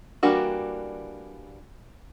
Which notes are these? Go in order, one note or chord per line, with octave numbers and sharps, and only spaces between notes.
E3 G3 A#3 D4 F#4